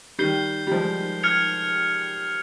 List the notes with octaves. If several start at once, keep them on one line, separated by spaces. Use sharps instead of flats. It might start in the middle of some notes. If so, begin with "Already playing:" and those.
D#3 G3 G6 C7 G7
G3
F3 G#3
F6 G#6 C#7 F7